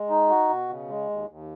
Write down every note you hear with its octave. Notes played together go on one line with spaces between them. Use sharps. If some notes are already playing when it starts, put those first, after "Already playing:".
Already playing: G#3
D#4
F#4
B2
C#3
G#3
D#2
D#2